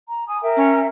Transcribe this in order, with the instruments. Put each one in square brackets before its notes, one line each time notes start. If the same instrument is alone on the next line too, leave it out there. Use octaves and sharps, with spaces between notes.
[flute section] A#5
G#5 D#6
A#4 E5 G5
[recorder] C#4